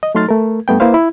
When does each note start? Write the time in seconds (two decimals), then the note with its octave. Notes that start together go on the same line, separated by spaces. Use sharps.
0.03 D#5
0.15 F#3 A3 D#4 C6 F6 A6
0.29 A3 A#4
0.68 G2 A3 B3 G5
0.80 A#3 E4 B4 C5 F5
0.94 E4